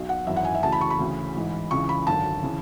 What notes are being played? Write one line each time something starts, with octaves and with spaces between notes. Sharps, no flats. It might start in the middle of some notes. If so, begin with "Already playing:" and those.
Already playing: B1 B2
F#5
G#1 F#2 E3 E5
F#5
G#5
E5
D2 C#3 E3 A5
B5
C#6
B5
D2 C#3 E3
A1 G#2 E3
C#2 C#3 E3 C#6
B5
G#1 F#2 D3 A5
C#3 E3